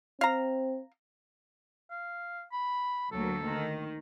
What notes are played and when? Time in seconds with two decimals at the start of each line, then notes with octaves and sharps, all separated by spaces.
0.21 C4 F5 A#5
1.91 F5
2.52 B5
3.12 D2 F#3 A#3 A4
3.48 D#3